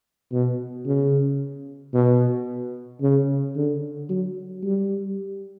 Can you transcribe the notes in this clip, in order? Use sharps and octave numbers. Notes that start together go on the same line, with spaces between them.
B2
C#3
B2
C#3
D3
F#3
G3